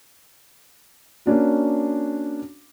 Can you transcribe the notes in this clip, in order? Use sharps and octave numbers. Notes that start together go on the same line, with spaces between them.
A#3 C#4 D4 F#4